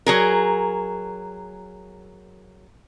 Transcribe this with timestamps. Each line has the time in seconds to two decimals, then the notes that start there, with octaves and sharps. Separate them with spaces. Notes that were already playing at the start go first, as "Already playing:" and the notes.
0.06 F#3 G#4 A#4